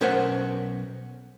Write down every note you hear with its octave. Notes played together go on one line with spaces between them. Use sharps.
B1 C#4 A#4 C5 E5 F#5